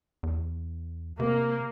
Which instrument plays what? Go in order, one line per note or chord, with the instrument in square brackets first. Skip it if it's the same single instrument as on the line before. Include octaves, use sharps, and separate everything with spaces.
[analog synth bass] E2
[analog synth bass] C3 [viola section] A#3